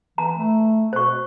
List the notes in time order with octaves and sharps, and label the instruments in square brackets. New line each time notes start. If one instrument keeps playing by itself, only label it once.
[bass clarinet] E3 [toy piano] A#5
[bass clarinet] A3
[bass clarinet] B2 [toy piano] C5 C#6